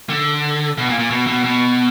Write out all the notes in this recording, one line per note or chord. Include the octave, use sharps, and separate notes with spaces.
D3
B2
A#2
A#2
B2
B2
B2